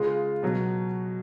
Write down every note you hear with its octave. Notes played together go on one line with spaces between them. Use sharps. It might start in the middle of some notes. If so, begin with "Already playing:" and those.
Already playing: C#3 G#3 F4
B2 F#3